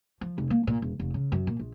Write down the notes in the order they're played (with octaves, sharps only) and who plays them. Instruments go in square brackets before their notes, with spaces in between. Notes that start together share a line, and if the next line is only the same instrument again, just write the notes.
[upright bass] F3
F1
A#3
A#2
E1
F1
C#3
F#2
A#2
A#1